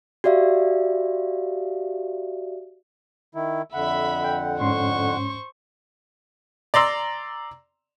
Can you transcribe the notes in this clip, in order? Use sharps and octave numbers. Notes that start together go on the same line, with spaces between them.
F#4 G4 D5 E5 F5
D#3 E4
F2 D3 E5 F#5 B5
G5
G#2 C#4 C5 C6 C#6
D5 A#5 C6 E6